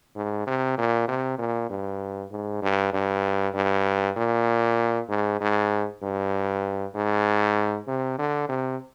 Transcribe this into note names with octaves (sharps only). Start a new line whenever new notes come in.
G#2
C3
A#2
C3
A#2
G2
G#2
G2
G2
G2
A#2
G#2
G#2
G2
G#2
C3
D3
C3